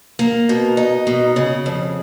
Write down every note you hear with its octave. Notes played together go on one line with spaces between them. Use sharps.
A#3
B2
D#4
B2
C#3
F2